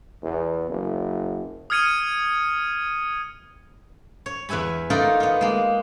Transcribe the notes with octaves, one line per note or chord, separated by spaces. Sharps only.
E2
F#1
D#6 F6 G#6 C#7 D#7
C#5
E2 B4 E5 G#5 B5
A3 D#4 F4 A#4 D5 F#5
B3 F4
G#3 A#3